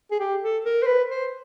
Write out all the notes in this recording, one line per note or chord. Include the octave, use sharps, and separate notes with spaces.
G#4
G4
A4
A#4
C5
B4
C5